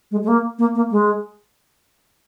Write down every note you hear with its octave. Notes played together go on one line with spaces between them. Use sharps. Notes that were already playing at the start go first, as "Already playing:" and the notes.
G#3
G#3
A#3
A#3
A#3
G#3